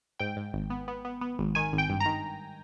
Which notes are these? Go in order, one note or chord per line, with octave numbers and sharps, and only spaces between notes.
G#2 G5
G#2
G#1
B3
B3
B3
B3
G#1
D#3 G#5
G#1
G5
G2
A#5
D#3